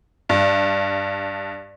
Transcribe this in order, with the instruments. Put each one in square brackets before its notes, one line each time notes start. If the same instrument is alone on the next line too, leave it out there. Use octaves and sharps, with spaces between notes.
[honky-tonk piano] G2